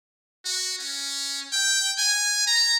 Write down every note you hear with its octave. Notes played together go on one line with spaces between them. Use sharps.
F#4
C#4
G5
G#5
A#5